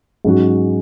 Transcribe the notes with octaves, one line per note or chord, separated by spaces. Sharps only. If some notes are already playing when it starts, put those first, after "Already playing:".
G#2 F#3 C#4 F#4